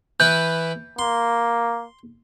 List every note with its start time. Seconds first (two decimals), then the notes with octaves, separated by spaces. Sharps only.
0.20 E3 E4 B4 G6
0.99 A#3 C6